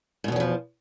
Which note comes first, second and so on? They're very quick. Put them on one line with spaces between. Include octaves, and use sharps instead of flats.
G#2 B2 E2 F#3 F3